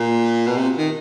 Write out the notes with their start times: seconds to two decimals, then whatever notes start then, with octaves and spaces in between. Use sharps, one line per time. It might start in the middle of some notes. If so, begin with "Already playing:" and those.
Already playing: A#2
0.47 B2
0.57 C3
0.78 D#3